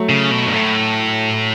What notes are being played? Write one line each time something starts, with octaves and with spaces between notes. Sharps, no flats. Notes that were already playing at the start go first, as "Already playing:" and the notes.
Already playing: F#3 A3
C#3
B2
G2
A2